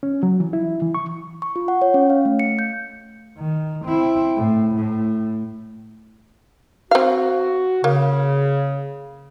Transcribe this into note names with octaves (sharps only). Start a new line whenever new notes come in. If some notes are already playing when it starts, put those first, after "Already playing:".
C#4
F#3
E3
E4
E3
C#6
C#6
F4
F#5
C#5
C#4
F5
A3
C#7
G6
D#3
C4 E4
A2
A2
C4 F#4 F5
C#3 A#3